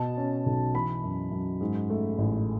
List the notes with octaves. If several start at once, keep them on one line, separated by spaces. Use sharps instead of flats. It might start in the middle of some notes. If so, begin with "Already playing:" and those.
Already playing: B2 A5
C#4
B1
E3 B5
F#2
F#2
G#2
A3
A1